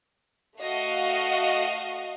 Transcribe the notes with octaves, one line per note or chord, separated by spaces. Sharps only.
A3 F#4 D#5 F5